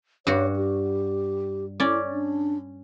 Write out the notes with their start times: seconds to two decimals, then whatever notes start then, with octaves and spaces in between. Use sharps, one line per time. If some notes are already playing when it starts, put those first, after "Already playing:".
0.27 G2 F#4 C#5
0.56 G4
1.80 C#4 E4 D5
2.11 D4